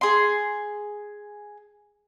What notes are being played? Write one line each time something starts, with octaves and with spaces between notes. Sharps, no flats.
G#4 C6